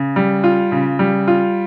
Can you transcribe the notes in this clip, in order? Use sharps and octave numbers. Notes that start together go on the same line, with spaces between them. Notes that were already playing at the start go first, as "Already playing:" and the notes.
Already playing: C#3
G3
F4
C#3
G3
F4